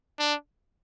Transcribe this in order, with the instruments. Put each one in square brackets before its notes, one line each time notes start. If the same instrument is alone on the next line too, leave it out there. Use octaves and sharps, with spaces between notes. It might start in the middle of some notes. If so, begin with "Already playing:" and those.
[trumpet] D4